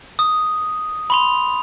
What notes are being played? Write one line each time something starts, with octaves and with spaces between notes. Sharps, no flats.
D#6
B5 C6 F7